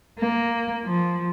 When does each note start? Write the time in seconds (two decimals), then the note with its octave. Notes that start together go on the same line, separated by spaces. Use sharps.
0.19 A#3
0.85 F3